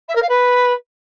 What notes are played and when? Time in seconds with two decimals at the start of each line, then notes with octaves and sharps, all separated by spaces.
0.08 E5
0.15 A#4
0.22 F5
0.29 B4